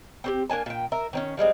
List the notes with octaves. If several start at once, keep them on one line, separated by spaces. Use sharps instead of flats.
C4 F#4 G4
A#3 D4 G#5 A5
A#2 G5
A#4 E5
D#3 C4 C#4
F3 G3 G#3 C4